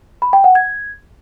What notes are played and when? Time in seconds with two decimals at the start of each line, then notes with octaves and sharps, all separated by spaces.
0.22 B5
0.33 G5
0.44 F#5
0.55 G#6